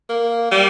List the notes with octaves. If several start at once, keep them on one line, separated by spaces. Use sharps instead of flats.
A#3
G3